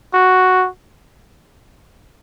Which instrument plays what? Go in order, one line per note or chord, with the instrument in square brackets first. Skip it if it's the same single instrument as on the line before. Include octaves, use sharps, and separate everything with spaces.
[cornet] F#4